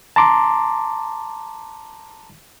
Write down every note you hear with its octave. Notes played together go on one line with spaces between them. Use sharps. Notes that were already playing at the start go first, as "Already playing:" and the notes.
A5 A#5 C6 D6